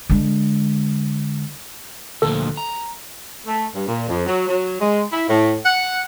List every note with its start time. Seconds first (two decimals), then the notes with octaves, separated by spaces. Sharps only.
0.10 D3 G#3
2.22 D2 A#2 F3 A4
2.57 A#5
3.46 A3
3.74 G2
3.87 A#2
4.08 F2
4.26 F#3
4.47 F#3
4.80 G#3
5.11 E4
5.28 A2
5.63 F#5